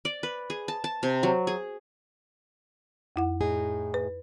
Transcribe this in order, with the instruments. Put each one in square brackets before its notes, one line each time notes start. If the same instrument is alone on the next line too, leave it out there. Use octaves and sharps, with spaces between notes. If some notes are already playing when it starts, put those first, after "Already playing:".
[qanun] D5
B4
G#4
A5
A5
C3
F#3
G#4
[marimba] F2 E4 F#5
[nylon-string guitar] A2 D#4 G#4
[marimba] B4